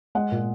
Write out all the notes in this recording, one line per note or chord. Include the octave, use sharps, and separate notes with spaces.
G#3 F#5
A#2